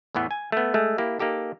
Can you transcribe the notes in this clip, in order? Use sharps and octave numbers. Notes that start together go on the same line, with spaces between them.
E2 A2 E3 B3
G#5
A3 B3
G#3 A3
A#3 E4 G4
A#3 D#4 G4 A4